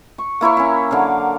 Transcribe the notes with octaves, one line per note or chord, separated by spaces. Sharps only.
C#6
A#3 E4 A#4 C#5
C#4 E4
D3 F#3 F5